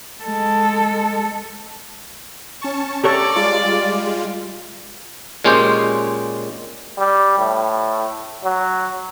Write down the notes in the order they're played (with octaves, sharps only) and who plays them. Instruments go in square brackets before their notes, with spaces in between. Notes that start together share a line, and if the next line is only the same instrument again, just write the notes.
[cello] G#3 A4
[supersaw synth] C#4 A5 C#6
[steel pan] G4 A4 C#5 [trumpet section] D5 [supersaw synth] A#5 C#6
[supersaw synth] G3 G#3 F4
[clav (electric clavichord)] A#2 G#3 C#4 G4 C5
[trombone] G3
A2
F#3